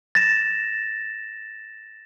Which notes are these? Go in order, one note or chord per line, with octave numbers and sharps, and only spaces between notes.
A6 A#6 E7